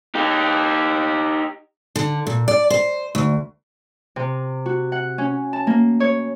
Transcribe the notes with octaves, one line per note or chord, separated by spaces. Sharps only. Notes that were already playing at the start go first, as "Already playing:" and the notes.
D#4 G4
D3
A#2
D5
C5
D2
C3
F#4
F#5
C#4
A5
A#3
C#5